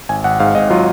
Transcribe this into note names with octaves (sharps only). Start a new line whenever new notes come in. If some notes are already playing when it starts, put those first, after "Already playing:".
G#1 G#5
G#1 F#5
G#2 F5
G#1 D#5
F#3 F4